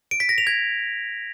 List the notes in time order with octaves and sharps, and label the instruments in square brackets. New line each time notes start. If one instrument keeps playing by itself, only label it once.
[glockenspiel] D7
B6
A#6
F7
G#6